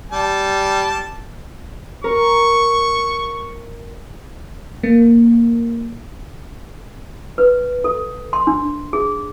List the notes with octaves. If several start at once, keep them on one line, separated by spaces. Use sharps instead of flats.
G3 A5
A#4 C#6
A#3
B4
A4
C6
D4
G#4